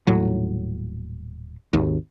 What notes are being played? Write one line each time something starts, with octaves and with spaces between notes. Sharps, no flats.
D#1 A2 F#3
G#1 D#2